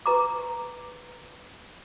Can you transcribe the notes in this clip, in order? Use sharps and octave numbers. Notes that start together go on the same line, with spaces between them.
B4 A#5 D6